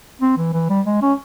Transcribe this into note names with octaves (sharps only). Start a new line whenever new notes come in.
C4
E3
E3
G3
G#3
C#4